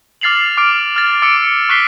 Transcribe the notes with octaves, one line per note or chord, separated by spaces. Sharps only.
D6 F6 A6 C7 F7 F#7
D6 F6 D7
F6 A6
D6 E6 C#7 D7
C#6 F#6 B6 C7 G7